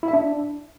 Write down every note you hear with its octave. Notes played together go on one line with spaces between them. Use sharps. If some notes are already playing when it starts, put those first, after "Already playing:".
E4
E5
D4